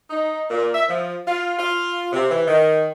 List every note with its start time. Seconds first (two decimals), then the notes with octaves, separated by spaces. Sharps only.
0.10 D#4
0.50 A#2
0.74 E5
0.88 F3
1.26 F4
1.59 F4
2.13 C3
2.30 E3
2.47 D#3